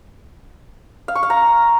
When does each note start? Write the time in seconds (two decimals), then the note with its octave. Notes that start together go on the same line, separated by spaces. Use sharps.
1.08 F5
1.15 C#6
1.23 F5
1.30 A#5